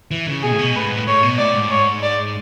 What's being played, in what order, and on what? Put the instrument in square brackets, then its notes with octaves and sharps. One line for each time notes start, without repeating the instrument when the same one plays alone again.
[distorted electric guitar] E3
C#3
[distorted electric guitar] B2 [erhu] G#4
[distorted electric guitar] A2
B2
[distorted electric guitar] A2 [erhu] B4
[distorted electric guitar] G#2
A2
[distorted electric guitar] A2 [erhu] C#5
[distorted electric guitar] B2
[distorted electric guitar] A2 [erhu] D5
[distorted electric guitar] G#2
[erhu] C#5
D5